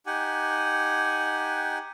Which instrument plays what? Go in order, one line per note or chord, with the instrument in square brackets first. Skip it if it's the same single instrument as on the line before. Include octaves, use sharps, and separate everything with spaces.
[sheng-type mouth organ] D#4 G4 F#5 G#5